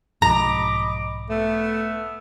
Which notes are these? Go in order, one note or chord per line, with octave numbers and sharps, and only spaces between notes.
B1 G#2 F3 D#5 A#5 B5 D6
A3 B3 E5